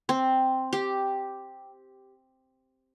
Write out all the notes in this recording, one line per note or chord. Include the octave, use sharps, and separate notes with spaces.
C4
G4